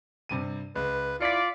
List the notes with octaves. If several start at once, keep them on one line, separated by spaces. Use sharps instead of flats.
G2 C3 D#7
C#2 B4
E4 F4 D5 B6 C#7